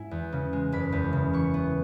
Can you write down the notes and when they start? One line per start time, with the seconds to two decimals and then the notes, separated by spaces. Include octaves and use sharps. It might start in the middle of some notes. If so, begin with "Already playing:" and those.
Already playing: G#2 E4 G#5
0.11 E2
0.32 C#3
0.53 G#3
0.72 F#1 B5
0.92 E2
1.13 C#3
1.33 E3 C#6
1.54 B3